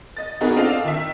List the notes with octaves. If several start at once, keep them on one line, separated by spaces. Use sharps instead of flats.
D#5 A6
B3 D#4 F#4 G#4 A#4
C4 D4 F4 A4 D#5 F5
D#3 D#4 E5